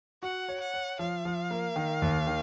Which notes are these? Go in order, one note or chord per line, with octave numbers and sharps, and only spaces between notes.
F#4 F#5
C#5
F#5
C#5
F3 F5
F3
A#3
D#3
D#2
D#3